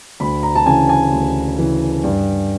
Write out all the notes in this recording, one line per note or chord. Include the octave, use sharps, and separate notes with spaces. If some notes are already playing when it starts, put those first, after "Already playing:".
D2 B5
A#5
A5
C#3 E3 G#5
G#5
D2
C#3 E3
G2